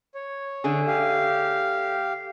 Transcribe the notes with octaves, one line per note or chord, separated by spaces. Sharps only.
C#5
D3 A3 G#4
G4 F5